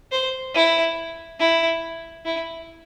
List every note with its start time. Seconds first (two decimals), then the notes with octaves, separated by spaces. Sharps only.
0.12 C5
0.54 E4
1.39 E4
2.25 E4